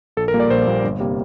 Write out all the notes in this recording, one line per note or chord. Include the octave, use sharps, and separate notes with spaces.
A#1 A4
A#4
A#2 G3 A#3
D5
A#1 C5
A#2 G3 A#3
G1
C3 G3 A#3